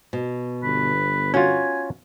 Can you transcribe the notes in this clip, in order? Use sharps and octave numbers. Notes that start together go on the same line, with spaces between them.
B2
G1 B4
C#4 F4 F#4 G#5